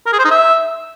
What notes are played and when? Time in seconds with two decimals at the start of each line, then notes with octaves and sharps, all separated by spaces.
0.07 A#4
0.13 G#4
0.19 C5
0.25 D#4
0.31 E5